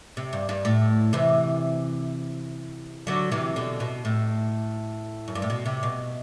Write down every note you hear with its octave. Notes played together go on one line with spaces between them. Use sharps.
C3
G2
G2
A2
C3 E3
D3 F#3
C3 E3
B2 D3
B2
A2
F#2
G2
A2
B2
C3
B2